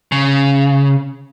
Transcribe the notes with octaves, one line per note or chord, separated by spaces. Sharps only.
C#3